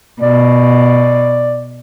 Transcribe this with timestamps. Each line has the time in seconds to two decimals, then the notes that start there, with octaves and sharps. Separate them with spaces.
0.22 B2 D5